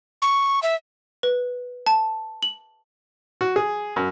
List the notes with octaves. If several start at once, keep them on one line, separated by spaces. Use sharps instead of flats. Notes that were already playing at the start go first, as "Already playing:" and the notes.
C#6
E5
B4
A5
F#7
F#4
G#4
F#2